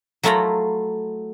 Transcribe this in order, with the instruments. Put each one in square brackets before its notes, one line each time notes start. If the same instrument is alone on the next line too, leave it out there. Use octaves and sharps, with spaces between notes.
[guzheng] F#3 A3 E4 F4 A#5 B5